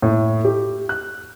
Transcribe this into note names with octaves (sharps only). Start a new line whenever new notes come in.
A2
G4
F#6